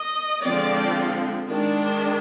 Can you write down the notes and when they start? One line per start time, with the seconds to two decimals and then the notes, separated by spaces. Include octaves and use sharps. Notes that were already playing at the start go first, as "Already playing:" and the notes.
Already playing: D#5
0.44 D3 F3 G#3 C4 D5
1.50 D#3 G#3 D4